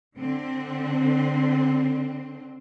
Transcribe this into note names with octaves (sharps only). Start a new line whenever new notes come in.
D3 C4